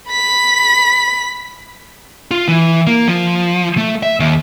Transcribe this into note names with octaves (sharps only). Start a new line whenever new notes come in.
B5 B6
F4
E3
A#3
F3
A3
E5
D#2